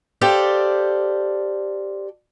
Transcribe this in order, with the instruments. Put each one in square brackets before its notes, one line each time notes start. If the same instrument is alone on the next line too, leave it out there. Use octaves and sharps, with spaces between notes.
[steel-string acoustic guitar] G4 A4 C5 D5 F5